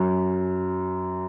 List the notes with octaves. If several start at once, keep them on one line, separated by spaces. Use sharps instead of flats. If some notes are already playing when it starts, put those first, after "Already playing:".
Already playing: F#2